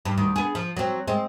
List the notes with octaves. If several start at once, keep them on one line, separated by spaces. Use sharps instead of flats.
G2
D2 D#3
B3 G#4
F3
F#3 C4
G#3 C4